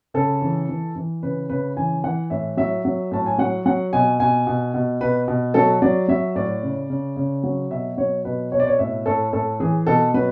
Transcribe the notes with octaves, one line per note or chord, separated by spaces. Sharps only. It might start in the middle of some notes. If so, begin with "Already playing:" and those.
C#3 A4
E3
E3
E3
C#3 B4
C#3 B4
E3 G#5
E3 F#5
A2 E5
F#3 E5
F#3
A2 A5
G#5
F#3 F#5
F#3 F#5
B2 G#5
B2 G#5
B2
B2
B2 B4
B2
F#3 A4
F#3 D5
F#3 E5
A2 D5
C#3
C#3
C#3
F#3
B2 E5
F#3 C#5
B2 B4
B2 C#5
D5
C#5
A2 E5
A2 A4
A2 A4
E3 G#4
B2 A4
F#3 B4